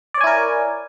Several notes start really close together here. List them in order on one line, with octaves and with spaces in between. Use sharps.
D5 C#5 G#5 E4 A#4